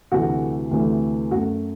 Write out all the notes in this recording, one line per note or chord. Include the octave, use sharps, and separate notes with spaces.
D2 C3 E3 A3 F#4
D2 C3 E3 A3
F#2 F#3 A3 F#4